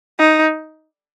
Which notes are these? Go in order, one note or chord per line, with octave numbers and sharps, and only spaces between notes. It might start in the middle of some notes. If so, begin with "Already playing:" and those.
D#4